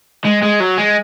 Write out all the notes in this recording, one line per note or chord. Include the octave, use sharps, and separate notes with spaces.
G#3
G#3
F#3
G#3